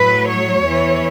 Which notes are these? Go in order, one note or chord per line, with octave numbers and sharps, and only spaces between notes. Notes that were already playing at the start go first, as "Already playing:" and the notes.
Already playing: A2 F#3 B4
C#5
E2 E3